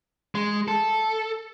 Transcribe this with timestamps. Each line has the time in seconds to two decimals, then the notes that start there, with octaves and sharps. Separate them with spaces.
0.35 G#3
0.68 A4